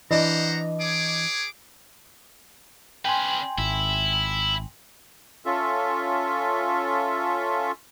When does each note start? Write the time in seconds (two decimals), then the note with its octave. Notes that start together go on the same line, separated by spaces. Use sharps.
0.11 E3 D4 C5 D#5 F#5 A#5
0.80 G#4 C#5 D6
3.05 C#4 B4 G5 G#5 C6
3.58 G#1 E4
5.45 C#4 F4 A4 E5